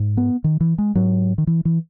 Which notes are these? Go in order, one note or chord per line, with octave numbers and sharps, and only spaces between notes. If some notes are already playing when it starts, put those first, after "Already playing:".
Already playing: G#2
B3
D#3
E3
G#3
G#2 F#3
D#3
E3
E3